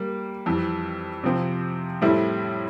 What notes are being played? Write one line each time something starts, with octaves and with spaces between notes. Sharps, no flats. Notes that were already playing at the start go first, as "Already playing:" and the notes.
Already playing: G3 A#3
F2 E3 G3
C3 F3 C4
A2 G3 C4 E4 A4